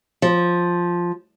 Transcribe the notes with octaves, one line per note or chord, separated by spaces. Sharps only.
F3